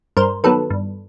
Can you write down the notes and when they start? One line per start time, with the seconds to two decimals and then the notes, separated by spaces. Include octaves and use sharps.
0.17 G2 A#4 C5
0.44 D#3 F#3 B3 A4 B4
0.70 G2